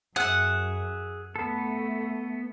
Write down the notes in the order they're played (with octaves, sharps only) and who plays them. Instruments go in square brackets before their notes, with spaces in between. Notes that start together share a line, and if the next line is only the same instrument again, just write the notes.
[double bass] F#2 [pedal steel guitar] G#4 E5 [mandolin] F#5
[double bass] A3 [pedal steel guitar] B3 A4